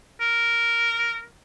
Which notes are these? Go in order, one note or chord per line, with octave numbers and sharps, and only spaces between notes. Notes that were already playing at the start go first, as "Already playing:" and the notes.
A#4